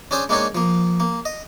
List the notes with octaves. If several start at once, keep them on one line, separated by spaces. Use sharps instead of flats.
C#4 D4 G#4 C5 D#6
G#3 A#3 D4 D#4 G#4 C#5
F3 A#3
A#3
D#5